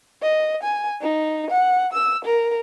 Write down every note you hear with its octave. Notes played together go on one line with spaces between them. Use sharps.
D#5
G#5
D#4
F#5
E6
A#4